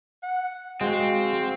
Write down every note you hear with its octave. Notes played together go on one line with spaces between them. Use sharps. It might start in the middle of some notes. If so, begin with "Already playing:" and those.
F#5
G#3 C4 F#4 F5